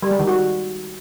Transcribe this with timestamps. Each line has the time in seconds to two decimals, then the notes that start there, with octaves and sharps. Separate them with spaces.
0.02 G3
0.11 G#3
0.19 D#3
0.27 F#4